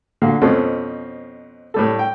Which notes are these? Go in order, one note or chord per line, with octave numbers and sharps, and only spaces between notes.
A#2 D3 F#4 F5
F2 B2 F3 A3 C4 C#4
A2 G3 A4
G5